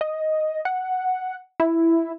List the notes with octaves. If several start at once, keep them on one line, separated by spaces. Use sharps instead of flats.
D#5
F#5
E4